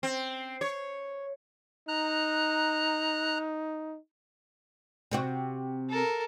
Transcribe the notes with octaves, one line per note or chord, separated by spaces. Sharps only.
C4
C#5
D#4 A#5 F#6
C3 C4 F#4
A4 A#4